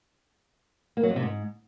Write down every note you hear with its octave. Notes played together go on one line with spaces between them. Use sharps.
A#3
F#3
F2
C3
G#2